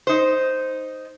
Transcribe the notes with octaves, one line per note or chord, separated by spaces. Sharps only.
D#4 C5